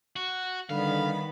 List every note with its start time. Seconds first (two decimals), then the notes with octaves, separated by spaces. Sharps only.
0.16 F#4
0.70 D3 D#3 G3 B3 F5 B5